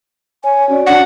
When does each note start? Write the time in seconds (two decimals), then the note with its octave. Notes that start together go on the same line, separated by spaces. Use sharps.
0.44 C#5 G#5
0.69 C#4 F#4 D5
0.87 D4 F#5